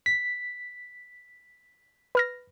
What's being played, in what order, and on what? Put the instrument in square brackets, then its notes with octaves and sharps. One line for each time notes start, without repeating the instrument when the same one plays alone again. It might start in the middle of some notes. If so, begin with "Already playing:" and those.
[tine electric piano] B6
[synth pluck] B4 F6 A#6